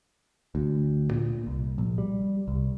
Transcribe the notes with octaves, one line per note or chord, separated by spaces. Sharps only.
D2
A#2
C2
A#1
G3
C2